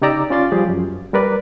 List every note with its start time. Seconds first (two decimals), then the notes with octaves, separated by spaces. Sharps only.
0.01 C#3 D#4 G4 D5 A#5 E6
0.30 C#4 F4 D5 C6 A6
0.52 F3 G3 G4 G#4
0.69 F#2
1.13 G3 A#4 B4 D5